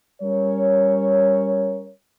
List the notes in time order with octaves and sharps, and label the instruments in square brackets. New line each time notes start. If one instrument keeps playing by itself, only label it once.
[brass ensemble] G3 C#4 A#4 C#5